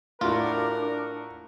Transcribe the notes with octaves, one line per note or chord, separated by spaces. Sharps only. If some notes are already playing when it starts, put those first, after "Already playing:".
A2 D4 F4 F#4 A#4